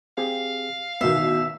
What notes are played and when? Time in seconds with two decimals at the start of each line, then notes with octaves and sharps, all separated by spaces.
0.18 C4 G4 G#4 F5
1.01 A1 B2 D#3 B3 E5